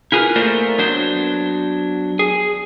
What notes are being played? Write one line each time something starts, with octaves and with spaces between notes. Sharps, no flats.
E4 F4 G#4 A#4 B4
A3 A#3 A#4 C5 D5
F#3 B3 D4 C5
G#4